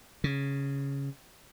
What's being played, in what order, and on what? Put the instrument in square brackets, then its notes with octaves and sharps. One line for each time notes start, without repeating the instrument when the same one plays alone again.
[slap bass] C#3